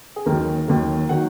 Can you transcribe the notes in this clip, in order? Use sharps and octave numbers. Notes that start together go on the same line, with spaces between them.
G#4
D#2 D#3 F#3 A#4
D#2 D#3 F#3
D#3 F#3 F#5